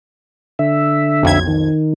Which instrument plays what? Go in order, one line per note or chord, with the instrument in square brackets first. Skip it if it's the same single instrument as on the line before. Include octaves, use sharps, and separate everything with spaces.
[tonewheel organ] D3 E5
[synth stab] B1 F2 G#6
[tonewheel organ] D#3